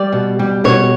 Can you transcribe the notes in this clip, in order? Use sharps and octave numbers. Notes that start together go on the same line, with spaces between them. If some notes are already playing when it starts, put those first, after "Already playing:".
Already playing: G3 D5
B2
G3
B2 C#5